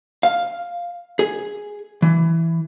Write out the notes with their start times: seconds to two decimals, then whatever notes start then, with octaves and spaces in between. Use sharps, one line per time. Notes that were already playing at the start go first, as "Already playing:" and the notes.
0.23 F5
1.19 G#4
2.02 E3